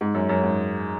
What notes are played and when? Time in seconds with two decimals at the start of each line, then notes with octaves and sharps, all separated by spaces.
0.01 G#2
0.14 F#2
0.29 F#2
0.43 G#2